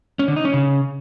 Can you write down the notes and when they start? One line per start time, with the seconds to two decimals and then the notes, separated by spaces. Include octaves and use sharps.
0.19 C#4
0.28 D3
0.36 D#4
0.45 C#4
0.53 C#3